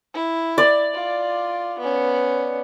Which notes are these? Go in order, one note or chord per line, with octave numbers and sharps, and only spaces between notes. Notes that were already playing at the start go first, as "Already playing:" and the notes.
E4
D5
F4
B3 C#4